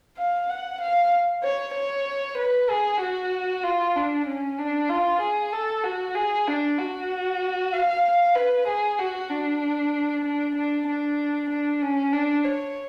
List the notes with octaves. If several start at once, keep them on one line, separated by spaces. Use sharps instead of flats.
F5
F#5
F5
C#5
C#5
B4
G#4
F#4
F4
D4
C#4
D4
F4
G#4
A4
F#4
G#4
D4
F#4
F5
B4
G#4
F#4
D4
D4
D4
D4
D4
C#4
D4
C#5